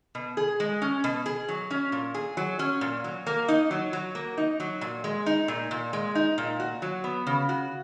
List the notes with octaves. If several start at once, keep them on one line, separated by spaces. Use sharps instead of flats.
B2
G#4
G#3
C#4
B2
G#4
F#3
C#4
A#2
G#4
F#3
C#4
A#2
F#3
A#3
D#4
F#3
F#3
A#3
D#4
F#3
A#2
G#3
D#4
A#2
A#2
G#3
D#4
A#2
F#4
F#3
B3
C#3
F#4